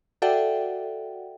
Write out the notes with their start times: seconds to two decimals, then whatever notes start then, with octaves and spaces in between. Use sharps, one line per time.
0.22 F#4 A4 D5 E5 F#5 G5